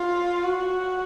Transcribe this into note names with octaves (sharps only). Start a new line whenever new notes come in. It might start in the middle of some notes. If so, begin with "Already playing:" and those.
Already playing: F4
F#4